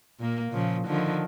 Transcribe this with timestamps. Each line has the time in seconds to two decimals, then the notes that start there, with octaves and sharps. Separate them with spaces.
0.20 A#2 A#3
0.52 A#2 C#3 F3
0.88 D3 D#3 F3